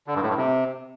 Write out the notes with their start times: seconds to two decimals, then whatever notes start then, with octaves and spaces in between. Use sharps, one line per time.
0.07 D3
0.15 G2
0.22 A2
0.29 G2
0.37 C3